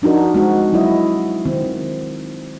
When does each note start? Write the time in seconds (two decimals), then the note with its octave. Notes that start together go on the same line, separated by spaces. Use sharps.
0.02 F3 D4 D#4 F#4 A#4
0.34 G#3 C4 F#4
0.72 F#3 E4 D#5
1.45 D#3 C4